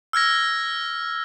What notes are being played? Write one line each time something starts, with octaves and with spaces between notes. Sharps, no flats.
E6 F6 G#6 A#6